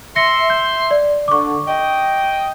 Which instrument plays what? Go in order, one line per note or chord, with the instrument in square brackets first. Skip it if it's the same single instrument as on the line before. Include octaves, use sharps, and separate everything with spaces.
[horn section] E5 C6 [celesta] A#6 C#7
[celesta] G6
D5
[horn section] D3 [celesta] C#6 D6
[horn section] D#5 G5